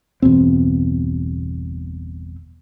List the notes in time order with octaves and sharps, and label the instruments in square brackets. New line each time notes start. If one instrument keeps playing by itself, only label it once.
[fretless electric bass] G1 E2 B2 C4